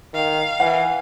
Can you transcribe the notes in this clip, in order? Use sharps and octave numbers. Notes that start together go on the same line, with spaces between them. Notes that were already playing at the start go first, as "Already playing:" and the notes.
D#3 F5
E3 F#5